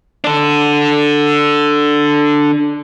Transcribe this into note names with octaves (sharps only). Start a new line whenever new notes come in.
D4 A4